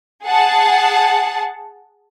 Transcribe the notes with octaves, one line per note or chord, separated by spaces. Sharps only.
G#4 F#5 A5